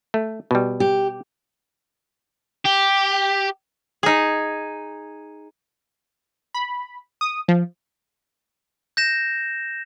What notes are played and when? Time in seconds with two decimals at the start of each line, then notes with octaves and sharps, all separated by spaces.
0.14 A3
0.51 B2 G3
0.80 G4
2.66 G4
4.03 D#4 G#4
6.54 B5
7.21 D#6
7.48 F3
8.97 G6 A#6 E7